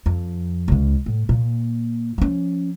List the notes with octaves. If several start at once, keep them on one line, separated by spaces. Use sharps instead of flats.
F2
C#2 C#3
A2
A#2
F3 C#4